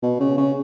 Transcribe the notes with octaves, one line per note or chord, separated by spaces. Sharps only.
B2
C#3
C#3